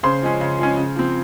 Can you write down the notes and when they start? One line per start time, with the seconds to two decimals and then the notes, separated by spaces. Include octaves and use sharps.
0.03 C#3 C5 C6
0.22 F3 G#3 C#4
0.41 C#3
0.59 F3 G#3 C#4
0.77 C#3
0.96 F3 C4